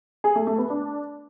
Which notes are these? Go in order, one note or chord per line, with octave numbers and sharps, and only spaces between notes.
G#4
A3
A3
B3
D4